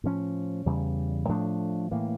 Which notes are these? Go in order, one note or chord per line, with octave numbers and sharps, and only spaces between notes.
A2 F3 C#4
E2 C#3 G3
A2 F3 A3 D4
A2 E3 A#3